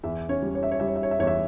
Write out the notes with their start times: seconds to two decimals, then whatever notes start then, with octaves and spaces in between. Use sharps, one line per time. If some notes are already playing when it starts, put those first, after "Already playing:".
0.03 E2 E4 E5
0.29 C#4 C#5
0.42 G3
0.55 C#5
0.63 E5
0.71 C#5
0.80 G3 E5
0.88 C#5
0.96 E5
1.03 C#5
1.11 E5
1.19 E2 C#5
1.27 E5